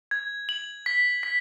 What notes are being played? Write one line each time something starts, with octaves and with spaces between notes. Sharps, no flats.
G#6
F#7
B6
B6